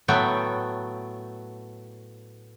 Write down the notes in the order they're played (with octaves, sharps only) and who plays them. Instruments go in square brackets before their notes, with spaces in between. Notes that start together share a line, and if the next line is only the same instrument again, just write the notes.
[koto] A2 F#3 A3 B3 G5